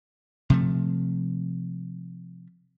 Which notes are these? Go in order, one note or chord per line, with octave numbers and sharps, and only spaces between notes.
C3 F3 A3